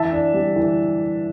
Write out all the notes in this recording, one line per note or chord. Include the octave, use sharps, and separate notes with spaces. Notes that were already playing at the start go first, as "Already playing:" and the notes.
Already playing: E3 E5 A5
D4
G3
E3